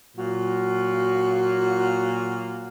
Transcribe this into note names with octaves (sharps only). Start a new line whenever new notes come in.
A#2 F#3 F4 F#4